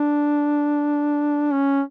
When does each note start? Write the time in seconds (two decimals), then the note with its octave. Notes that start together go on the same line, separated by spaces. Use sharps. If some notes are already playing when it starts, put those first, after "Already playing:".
Already playing: D4
1.52 C#4